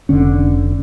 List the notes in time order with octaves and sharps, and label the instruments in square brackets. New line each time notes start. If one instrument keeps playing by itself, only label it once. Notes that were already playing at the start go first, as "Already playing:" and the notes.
[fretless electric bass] F1 D3 C#4